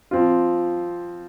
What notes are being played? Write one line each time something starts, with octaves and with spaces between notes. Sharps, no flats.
F3 C4 F4